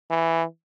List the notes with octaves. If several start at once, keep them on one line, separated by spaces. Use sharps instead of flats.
E3